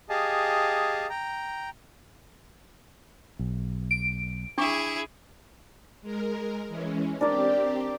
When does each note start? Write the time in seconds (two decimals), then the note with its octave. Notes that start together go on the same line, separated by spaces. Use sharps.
0.09 G4 G#4 D#5 F5 G#5 A5
1.10 G5 A#5
3.39 B1
3.91 D7
4.58 D4 E4 G#4 C#6 D6
6.02 G#3 A#4
6.68 E3 G#3 C#4
7.21 C4 D4 G4 A#4 D5